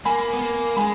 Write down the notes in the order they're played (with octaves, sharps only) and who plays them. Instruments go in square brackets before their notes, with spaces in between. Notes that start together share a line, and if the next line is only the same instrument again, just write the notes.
[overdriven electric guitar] A#3 [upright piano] G#5 B5
[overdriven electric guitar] B3
A#3
[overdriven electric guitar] G#3 [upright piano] G#5 B5